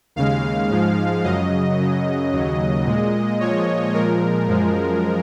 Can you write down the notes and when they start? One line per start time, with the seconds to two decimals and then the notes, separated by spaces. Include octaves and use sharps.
0.16 D#2 C#3 G#3 F5
0.70 G#2 F3 G#3
1.24 F#2 C#3 F#3 D#5
1.78 F#2 C#3 F#3
2.32 D#2 C#3 F#3
2.86 A#2 G#3
3.40 A#2 F3 G#3 C#5
3.94 A#2 F3 G#3 A#4
4.48 F#2 F3 G#3